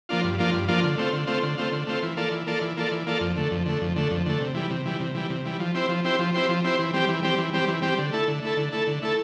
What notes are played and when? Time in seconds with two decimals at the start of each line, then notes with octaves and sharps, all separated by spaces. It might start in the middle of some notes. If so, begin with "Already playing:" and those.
0.09 F3 A#3 D4 F4
0.24 G2
0.38 F3 A#3 D4 F4
0.53 G2
0.68 F3 A#3 D4 F4
0.84 D3
0.97 A3 C4 F4
1.13 D3
1.27 A3 C4 F4
1.43 D3
1.58 A3 C4 F4
1.72 D3
1.87 A3 C4 F4
2.03 E3
2.17 A#3 F4 A4 D5
2.31 E3
2.47 A#3 F4 A4 D5
2.61 E3
2.77 A#3 F4 A4 D5
2.92 E3
3.07 A#3 F4 A4 D5
3.21 F2
3.36 D3 A3
3.51 F2
3.66 D3 A3
3.81 F2
3.96 D3 A3
4.11 F2
4.26 D3 A3
4.40 C3
4.55 E3 G3
4.70 C3
4.85 E3 G3
5.00 C3
5.15 E3 G3
5.30 C3
5.45 E3 G3
5.60 F3
5.75 C4 E4 G4 C5
5.89 F3
6.04 C4 E4 G4 C5
6.19 F3
6.34 C4 E4 G4 C5
6.49 F3
6.64 C4 E4 G4 C5
6.79 E3
6.93 G3 C4 G4
7.08 E3
7.23 G3 C4 G4
7.38 E3
7.53 G3 C4 G4
7.68 E3
7.82 G3 C4 G4
7.98 D3
8.12 A3 E4 A4
8.28 D3
8.42 A3 E4 A4
8.57 D3
8.72 A3 E4 A4
8.87 D3
9.02 A3 E4 A4